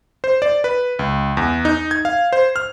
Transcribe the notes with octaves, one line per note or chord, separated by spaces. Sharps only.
C5
D5
B4
C#2
E2
D#4
G#6
F5
C5
F6